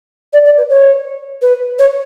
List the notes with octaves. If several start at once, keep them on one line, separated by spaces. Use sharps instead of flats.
D5
D5
B4
C#5
B4
C#5